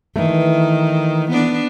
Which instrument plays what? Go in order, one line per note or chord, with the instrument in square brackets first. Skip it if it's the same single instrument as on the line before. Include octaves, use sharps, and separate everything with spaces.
[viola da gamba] D#3 [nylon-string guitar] E3 A3
[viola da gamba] B3 D4